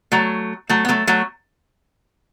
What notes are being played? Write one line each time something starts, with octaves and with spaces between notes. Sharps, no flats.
F#3 A3
F#3 A3
B3
F#3 A3
F#3 A3